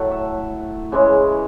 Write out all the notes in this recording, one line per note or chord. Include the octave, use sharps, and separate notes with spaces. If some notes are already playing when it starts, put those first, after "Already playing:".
Already playing: A2 F#3 A3 F#5
E5
C#3 E3 G#3